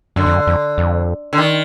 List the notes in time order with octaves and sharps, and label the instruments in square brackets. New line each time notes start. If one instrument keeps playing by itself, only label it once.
[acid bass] F#2 [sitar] D3
[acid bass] F2
F#2
F2
F2
[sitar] D3
D#3